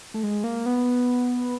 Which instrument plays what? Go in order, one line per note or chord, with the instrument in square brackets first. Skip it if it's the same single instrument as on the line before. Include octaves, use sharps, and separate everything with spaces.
[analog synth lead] A3
G#3
A#3
B3